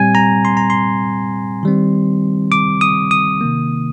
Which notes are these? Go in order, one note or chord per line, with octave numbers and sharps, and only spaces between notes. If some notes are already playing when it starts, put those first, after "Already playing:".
Already playing: A#2 G3 C4 G#5
A#5
C6
A#5
C6
D#3 G3 C4
D6
D#6
D#6
C3 D#3 A#3